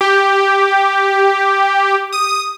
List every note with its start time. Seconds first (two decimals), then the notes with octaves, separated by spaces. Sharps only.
0.01 G4
2.13 D#6